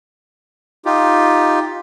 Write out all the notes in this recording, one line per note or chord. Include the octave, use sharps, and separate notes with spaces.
D#4 F4 G4